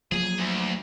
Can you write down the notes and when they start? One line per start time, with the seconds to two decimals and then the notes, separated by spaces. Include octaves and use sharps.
0.12 F3 F#3 A#3 G#4
0.38 D2